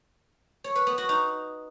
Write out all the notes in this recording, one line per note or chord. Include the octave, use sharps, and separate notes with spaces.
C#5
B4
B3
F#4
D#4